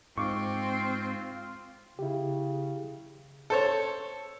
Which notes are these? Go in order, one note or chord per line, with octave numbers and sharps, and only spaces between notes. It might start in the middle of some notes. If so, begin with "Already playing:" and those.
G#2 C4 F4 C#6 D6
C#3 E4 G4
A4 C5 C#5